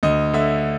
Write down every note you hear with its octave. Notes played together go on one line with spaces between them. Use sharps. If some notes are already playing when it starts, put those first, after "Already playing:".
D2 D#5
D3 E5